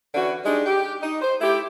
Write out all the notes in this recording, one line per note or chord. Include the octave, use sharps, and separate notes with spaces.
D3 E3 C#4 F#4
G3 G#3 D4 D#4
G4
D#4
C5
A3 E4 G4